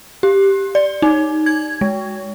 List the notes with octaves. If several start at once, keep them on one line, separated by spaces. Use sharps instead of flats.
G4
D5
D#4
G#6
G#3